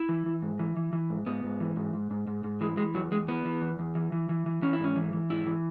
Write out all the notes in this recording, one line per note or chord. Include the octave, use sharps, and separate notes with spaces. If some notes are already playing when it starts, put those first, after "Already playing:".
Already playing: E4
E3
E3
G#2
E3
E3
E3
G#2
G#2 B3
G#2
E3
G#2
G#2
G#2
G#2
G#2
E3 G#3
E3 G#3
E2 F#3
E2 G#3
E3 B3
E3
E2
E2
E3
E3
E3
E3
E3 C#4
E4
G#2 C#4
E3
E3
G#2 E4
E3